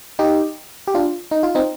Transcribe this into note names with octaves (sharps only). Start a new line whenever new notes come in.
D#4 G4
G4
D4 F4
D#4
F4
C4 D#4